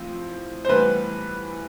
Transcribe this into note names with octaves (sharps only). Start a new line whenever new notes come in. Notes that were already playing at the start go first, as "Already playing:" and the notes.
Already playing: A2 F3 C4
C5
A2 E3 G3 B3 B4